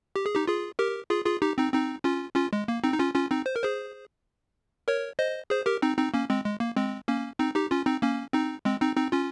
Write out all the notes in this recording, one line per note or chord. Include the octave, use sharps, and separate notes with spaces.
G4
G#4
D#4 G4
F4 G#4
G4 A#4
F4 G#4
F4 G#4
D#4 G4
C4 D#4
C4 D#4
C#4 F4
C#4 F4
G#3
A#3
C4 D#4
D#4
C#4 F4
C#4 F4
C4 D#4
C5
A#4
G#4 C5
A#4 C#5
C5 D#5
G#4 C5
G4 A#4
C4 D#4
C4 D#4
A#3 C#4
G#3 C4
G#3
A#3
G#3 C4
A#3 C#4
C4 D#4
D#4 G4
C#4 F4
C4 D#4
A#3 C#4
C4 D#4
G#3 C4
C4 D#4
C4 D#4
C#4 F4